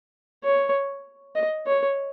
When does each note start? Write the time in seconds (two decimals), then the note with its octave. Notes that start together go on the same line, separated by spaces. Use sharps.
0.44 C#5
1.36 D#5
1.66 C#5